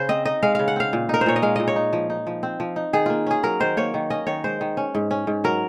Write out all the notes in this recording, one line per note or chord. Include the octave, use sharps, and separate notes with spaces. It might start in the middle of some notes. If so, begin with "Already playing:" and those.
Already playing: C#3 C5
C4 D#5
D#4 D#5
G#3 F5
C#3 F5
F#5
C4 F5
A#2
D#4 A#4
C5
A#2 C#5
D#5
G#3 F5
A#2 D#5
C#5
D#4
F3
D#4
F3
C4
F3
D#4
D#3 G#4
A#3 F4
C#4 G#4
F#3 A#4
D#3 C5
A#3 C#5
D#3
C#4 D#5
D#3 C#5
G#3 C5
D#3
C#4
G#2
C#4
G#2
F#3 A#4